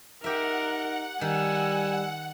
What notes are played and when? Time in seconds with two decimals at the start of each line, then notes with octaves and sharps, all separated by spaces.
0.24 D#4 G4 A#4 E5 F#5
1.21 D#3 G3 G#5 E6